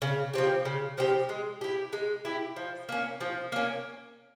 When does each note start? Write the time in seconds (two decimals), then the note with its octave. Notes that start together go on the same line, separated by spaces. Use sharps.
0.02 C#3
0.33 F3 C4 G4
0.65 C#3
0.98 F3 C4 G4
1.29 G#3
1.61 E4 G4
1.93 G#3
2.25 E4 G4
2.56 F3
2.89 A#3 C#4
3.21 F3
3.52 A#3 C#4